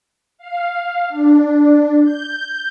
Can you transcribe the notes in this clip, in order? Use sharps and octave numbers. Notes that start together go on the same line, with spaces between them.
F5
D4
G6